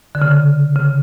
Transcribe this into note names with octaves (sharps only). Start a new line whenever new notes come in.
D3
C#3
C#3